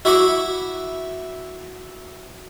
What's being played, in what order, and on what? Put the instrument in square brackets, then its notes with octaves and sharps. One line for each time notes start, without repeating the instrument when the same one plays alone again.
[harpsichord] E4 F#4 E5 B5 C#6 D6